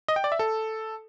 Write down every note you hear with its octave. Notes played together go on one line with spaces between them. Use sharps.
D#5
G5
D5
E5
A4